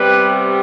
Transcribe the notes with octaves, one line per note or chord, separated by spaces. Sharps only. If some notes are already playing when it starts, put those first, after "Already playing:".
Already playing: C3 G3 B3 G4 B4